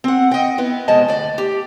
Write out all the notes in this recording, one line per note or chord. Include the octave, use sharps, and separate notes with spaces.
C4 F#5
D#5 G5
B3 E4 B4
F2 B2 F3 G#3 D#5 A5
D2 D5
G4